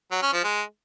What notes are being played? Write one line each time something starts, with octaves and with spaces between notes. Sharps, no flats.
F#3
C#4
F3
G#3